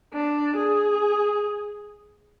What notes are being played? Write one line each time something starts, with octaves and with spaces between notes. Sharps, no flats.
D4
G#4